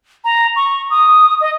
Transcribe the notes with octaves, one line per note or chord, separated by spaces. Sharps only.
A#5
C#6
D#6
D#5